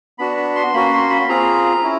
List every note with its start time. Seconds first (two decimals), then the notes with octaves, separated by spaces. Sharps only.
0.19 B3 D4 F#4 B5
0.37 B5
0.56 C6
0.74 A#3 C#4 F#4 B5
0.92 C6
1.10 B5
1.29 C4 F4 G#4 A#5
1.84 C#4 E4